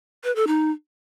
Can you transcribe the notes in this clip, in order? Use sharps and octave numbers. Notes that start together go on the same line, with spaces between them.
B4
A4
D#4